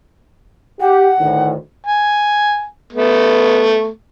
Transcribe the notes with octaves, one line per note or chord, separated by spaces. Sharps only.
G4 F#5
D2 A2 D#3
G#5
A3 B3